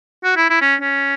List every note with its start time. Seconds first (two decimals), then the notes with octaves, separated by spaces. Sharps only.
0.24 F#4
0.37 E4
0.50 E4
0.61 C#4
0.81 C#4